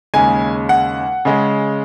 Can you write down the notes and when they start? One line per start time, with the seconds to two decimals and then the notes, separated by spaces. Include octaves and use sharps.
0.14 D#2 C#3 G#3 G#5
0.69 F#5
1.25 C#3 G#3